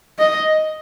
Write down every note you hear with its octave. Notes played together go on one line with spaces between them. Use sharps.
D#5